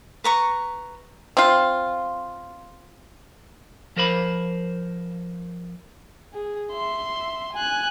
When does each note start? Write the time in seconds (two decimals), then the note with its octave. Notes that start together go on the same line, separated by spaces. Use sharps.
0.24 B4 A#5 C#6
1.37 C4 F4
3.96 F3 A#4 C5 B5
6.34 G#4
6.73 E5 C6
7.53 G#5 F#6